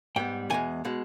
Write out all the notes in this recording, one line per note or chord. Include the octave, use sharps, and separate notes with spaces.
G#2 G3 B3 G5
E2 B2 G#3 G#5
B2 G#3